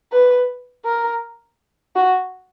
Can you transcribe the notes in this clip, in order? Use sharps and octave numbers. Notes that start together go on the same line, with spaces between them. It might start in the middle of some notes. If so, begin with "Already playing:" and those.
B4
A#4
F#4